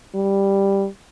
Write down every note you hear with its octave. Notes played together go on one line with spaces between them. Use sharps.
G3